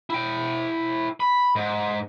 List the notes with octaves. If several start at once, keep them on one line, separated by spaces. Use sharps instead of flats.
E4 G5
B5
G#2